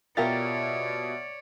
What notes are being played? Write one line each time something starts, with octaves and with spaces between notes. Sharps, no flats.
B2 F4 G4 A#4 C#5 D5 E5 A6